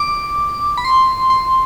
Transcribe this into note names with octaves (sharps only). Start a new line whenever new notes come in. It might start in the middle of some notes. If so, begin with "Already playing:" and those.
Already playing: D6
B5
C6
C6